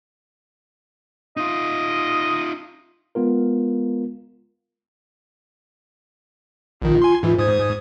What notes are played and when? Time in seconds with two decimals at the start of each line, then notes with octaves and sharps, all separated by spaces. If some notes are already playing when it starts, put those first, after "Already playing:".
1.37 D#4 F4 D#5
3.15 G#3 B3 F4 A#4
6.82 A#1 D#3 F4
7.02 G#5 C6
7.23 G#2 E3 F4
7.38 G#2 C5 D#6 G#6